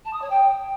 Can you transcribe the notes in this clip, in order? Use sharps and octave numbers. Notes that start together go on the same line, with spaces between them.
A5
D#6
C#5
G5